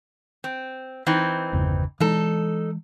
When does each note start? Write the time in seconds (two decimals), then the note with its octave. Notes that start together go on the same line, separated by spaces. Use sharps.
0.44 C4
1.07 E3 C4 D#4
1.53 G1 E2 C#3
2.00 E3 G#3 D#4 A4